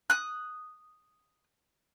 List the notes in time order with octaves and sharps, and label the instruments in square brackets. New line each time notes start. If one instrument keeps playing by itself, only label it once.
[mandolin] D#6 F#6